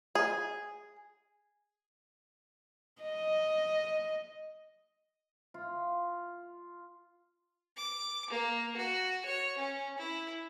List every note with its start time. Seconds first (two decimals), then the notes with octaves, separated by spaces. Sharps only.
0.15 G#4
3.02 D#5
5.54 F4
7.76 D6
8.31 A#3
8.76 F#4
9.25 C#5
9.58 C#4
9.98 E4